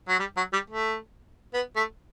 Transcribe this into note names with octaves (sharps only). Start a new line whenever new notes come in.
F#3
G3
F#3
G3
A3
B3
A3